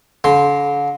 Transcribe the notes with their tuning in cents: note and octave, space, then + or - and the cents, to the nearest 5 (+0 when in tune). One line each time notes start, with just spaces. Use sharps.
D3 -40 C6 +0